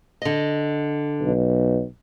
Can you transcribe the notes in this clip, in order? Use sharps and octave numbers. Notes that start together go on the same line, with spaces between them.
D3 D#5
B1